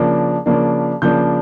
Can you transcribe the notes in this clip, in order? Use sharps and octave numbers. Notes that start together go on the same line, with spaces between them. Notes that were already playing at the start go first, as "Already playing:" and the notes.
Already playing: C#3 F3 A#3 D4
C#3 F3 A#3 D4
C#3 F3 A#3 D4 G6